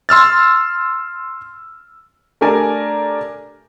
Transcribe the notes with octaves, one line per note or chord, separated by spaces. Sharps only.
C6 E6 F6 A6
A3 D4 G4 A#4 D5 G#5